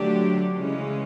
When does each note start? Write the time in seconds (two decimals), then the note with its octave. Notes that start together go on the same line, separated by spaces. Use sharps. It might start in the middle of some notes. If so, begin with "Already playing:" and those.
Already playing: D3 F#3 A3 D4 G4
0.55 C#3 E3 G#3 C#4